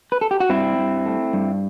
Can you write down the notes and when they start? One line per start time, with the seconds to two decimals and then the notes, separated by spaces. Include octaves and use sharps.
0.12 B4
0.21 A4
0.31 G4
0.40 F#4
0.49 G2 C4 E4
0.78 G2
1.06 A3
1.33 G2